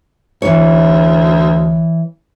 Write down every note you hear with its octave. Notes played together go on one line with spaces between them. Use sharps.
D2 E3 C#5